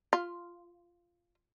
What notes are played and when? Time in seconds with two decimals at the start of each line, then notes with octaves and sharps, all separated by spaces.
0.13 F4